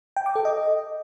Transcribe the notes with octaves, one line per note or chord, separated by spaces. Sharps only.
G5
D6
A4
D#5